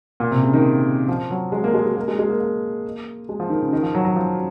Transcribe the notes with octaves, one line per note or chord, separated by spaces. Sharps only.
A#2
C3
C#3
D#3
F3
F#3
G#3
A#3
G#3
G#3
A#3
G#3
G#3
A#3
A#3
G#3
F3
D#3
C#3
D#3
F3
F#3
F#3
F3